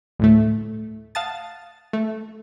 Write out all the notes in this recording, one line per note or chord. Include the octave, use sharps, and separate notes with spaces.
D2 A2 A3
F5 F#5 A5 D#6 A6
A3